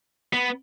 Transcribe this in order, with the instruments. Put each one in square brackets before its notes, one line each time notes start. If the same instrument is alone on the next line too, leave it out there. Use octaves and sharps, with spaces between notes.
[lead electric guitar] B3